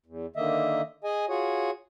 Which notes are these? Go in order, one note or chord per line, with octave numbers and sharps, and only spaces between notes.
E2
D3 D#3 A#3 D#5 E5
G#4 D#5 G#5
F4 F#4 G#4 C#5